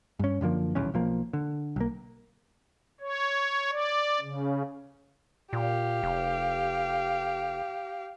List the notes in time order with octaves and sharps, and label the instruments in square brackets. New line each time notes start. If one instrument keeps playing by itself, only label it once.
[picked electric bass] G2 C#4
F#2 D3 F3 A#3
D#1 B1 E2 C#4
B1 F3 A#3
D3
B1 A#3
[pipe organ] C#5
D5
C#3
[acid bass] A#2 [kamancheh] G4 F5
[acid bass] F1